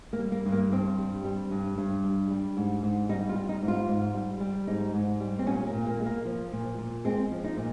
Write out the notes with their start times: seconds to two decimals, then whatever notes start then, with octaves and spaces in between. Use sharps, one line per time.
0.13 A#3
0.19 G3
0.32 A#3
0.46 G2
0.52 A#3
0.72 G2 C4
0.98 G3
1.24 G3
1.51 G2
1.78 G2
2.04 G3
2.30 G3
2.57 G#2
2.83 G#2
3.09 G3 D#4
3.29 F4
3.35 G3
3.49 D#4
3.63 G#2
3.68 F4
3.88 G#2
4.14 G3
4.40 G3
4.67 G#2 D#4
4.94 G#2
5.20 G3
5.39 C4
5.46 A#2 C#4
5.67 A#3
5.73 A#2
5.86 A#3
5.99 G#3
6.06 A#3
6.25 F3
6.53 A#2
6.78 A#2
7.05 G#3 C4
7.32 F3
7.44 D#4
7.57 A#2